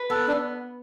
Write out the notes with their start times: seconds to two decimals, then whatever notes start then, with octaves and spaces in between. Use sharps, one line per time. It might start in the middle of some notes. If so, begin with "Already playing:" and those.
Already playing: B4
0.10 B3 A4
0.28 D4